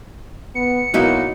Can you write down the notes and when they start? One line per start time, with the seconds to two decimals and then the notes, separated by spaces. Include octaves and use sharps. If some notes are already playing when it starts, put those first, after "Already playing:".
0.55 B3 C#7
0.94 B2 F#3 A#3 D#4 E4 F#4 D#5